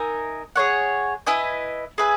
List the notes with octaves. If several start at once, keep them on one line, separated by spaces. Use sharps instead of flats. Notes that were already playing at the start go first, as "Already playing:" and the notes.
Already playing: D#4 A#4 E5 G#5
G#4 C#5 F#5
E4 B4 D#5 G#5
G#4 B4 E5 G#5